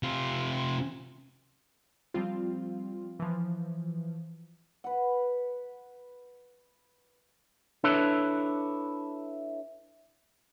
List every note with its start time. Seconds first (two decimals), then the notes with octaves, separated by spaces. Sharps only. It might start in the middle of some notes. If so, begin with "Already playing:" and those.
0.03 C3 F4
2.14 F3 G3 C4 F4
3.19 E3 F3
4.84 B4 F#5
7.84 D4 E4 A4 B4 C#5